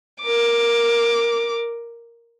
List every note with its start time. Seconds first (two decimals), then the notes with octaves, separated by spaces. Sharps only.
0.22 A#4 D6